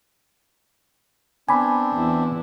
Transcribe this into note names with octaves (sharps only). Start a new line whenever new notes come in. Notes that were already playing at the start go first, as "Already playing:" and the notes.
B3 C4 D4 G#5 B5 D6
E2 E4